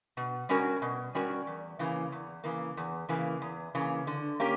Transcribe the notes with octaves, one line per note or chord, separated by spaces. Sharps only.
B2
G3 C#4 F#4 A#4
B2
G3 C#4 F#4 A#4
E2
C#3 E3 A#3
E2
C#3 E3 A#3
E2
C#3 E3 A#3
E2
C#3 E3 A#3
D3
A#3 C#4 G4 A#4